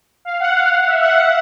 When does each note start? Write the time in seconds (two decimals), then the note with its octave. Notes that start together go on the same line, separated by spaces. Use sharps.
0.25 F5
0.40 F#5
0.56 F5
0.72 F5
0.87 E5
1.03 F#5
1.18 F#5